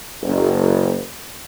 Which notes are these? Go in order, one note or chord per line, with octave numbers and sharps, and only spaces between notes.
F#1